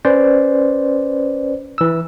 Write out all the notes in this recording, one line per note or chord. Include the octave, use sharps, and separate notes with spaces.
C#4 B4 C5 D5
E3 E6